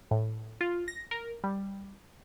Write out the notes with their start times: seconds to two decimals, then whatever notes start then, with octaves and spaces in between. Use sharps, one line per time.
0.11 A2
0.61 F4
0.88 A#6
1.11 A#4
1.44 G3